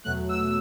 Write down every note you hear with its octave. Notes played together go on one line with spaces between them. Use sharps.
E2 B2 F#3 A3 F#6
E6